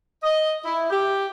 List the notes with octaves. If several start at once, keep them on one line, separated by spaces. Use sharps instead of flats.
D#5
E4
G4